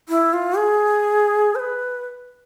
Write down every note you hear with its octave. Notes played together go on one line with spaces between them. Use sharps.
E4
F4
G#4
C5
B4